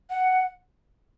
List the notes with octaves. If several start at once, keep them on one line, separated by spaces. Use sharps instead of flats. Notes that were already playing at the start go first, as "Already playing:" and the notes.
F#5